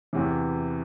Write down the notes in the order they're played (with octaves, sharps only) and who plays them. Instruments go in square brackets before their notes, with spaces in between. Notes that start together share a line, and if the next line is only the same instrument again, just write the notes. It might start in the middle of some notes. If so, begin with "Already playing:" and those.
[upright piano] E2 C3 E3